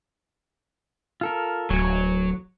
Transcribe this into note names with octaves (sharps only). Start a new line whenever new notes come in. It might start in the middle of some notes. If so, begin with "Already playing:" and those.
F4 A4 A#4
D1 F#3 C#5 G#5